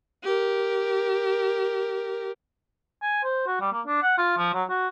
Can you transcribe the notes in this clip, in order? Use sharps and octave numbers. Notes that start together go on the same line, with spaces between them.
G4 A#4
G#5
C5
F#4
G3
A#3
D4
F#5
F4
F3
F#3
F#4